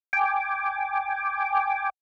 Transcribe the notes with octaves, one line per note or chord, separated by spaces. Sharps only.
G5 G#5 D6